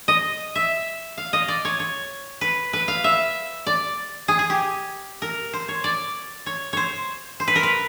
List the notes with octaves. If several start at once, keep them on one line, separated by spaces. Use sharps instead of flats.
D#5
E5
F5
D#5
D5
C#5
C#5
B4
B4
F5
E5
D5
G#4
G#4
G4
A#4
C5
C#5
D5
C#5
C5 C#5
C5
B4
A#4
B4